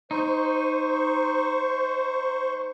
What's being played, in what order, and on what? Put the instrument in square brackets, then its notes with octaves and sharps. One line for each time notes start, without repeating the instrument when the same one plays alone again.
[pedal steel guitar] D#4 [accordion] C5 C#6